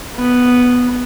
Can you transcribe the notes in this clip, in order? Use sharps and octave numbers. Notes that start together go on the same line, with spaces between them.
B3